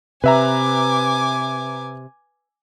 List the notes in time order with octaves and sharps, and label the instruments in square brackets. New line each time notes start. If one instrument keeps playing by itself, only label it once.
[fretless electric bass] C3 [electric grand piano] B4 E5 A#5 [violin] G#5 D6